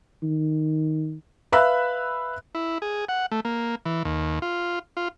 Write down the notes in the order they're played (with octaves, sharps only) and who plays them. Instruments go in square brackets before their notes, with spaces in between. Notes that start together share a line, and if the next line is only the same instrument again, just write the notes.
[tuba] D#3
[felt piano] B4 E5 F5 B5 E6 F#6
[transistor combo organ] E4
G#4
F#5
A3
A#3
E3
D#2
F4
F4